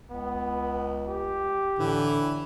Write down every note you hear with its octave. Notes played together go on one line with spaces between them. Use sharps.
C#2 B3
G4
A2 D3 E3